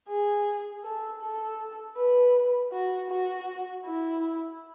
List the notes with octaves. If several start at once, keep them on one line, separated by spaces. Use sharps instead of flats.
G#4
A4
A4
B4
F#4
F#4
E4